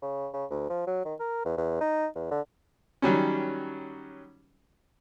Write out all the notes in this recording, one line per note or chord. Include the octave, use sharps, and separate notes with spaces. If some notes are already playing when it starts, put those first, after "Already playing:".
C#3
C#3
D2
F3
F#3
D#3
A#4
E2
E2
D#4
E2
D3
D#3 F#3 G3 C#4